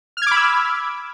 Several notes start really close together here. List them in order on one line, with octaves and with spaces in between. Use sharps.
F6 G#6 D6 B5 E6